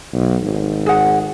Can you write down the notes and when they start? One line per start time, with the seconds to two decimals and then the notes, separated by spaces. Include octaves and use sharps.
0.14 B1
0.43 G#1
0.86 G#4 F#5